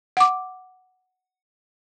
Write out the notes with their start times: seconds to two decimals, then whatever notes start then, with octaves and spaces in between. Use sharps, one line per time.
0.17 F#5 D6